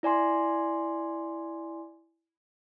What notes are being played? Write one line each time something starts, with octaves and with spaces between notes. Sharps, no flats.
E4 D5 G#5 C6